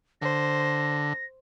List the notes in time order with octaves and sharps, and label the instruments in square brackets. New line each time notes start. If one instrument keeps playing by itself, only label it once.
[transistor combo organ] D3 [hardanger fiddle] C5 [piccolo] A#6